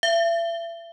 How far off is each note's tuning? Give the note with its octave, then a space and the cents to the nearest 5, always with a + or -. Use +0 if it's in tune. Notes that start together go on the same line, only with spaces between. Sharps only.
E5 +35